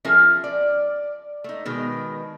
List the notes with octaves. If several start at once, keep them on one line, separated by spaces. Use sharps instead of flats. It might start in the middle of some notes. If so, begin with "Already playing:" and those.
F3 C#4 F4 G#4 A#4 E5
D5
A3 D#4
B2 D#3 G#3